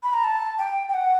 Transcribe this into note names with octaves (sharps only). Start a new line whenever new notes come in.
B5
A#5
A5
G5
G5
F#5